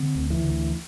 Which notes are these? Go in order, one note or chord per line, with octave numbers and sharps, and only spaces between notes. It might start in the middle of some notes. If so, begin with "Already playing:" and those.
Already playing: D3 C4
D2
E3
D2